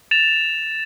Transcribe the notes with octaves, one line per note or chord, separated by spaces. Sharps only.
A6 E7 F7